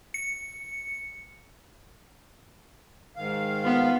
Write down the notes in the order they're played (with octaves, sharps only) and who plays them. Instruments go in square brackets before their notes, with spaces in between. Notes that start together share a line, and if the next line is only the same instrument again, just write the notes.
[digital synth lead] C#7
[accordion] G#2 D#3 F5
[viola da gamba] B3 [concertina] F4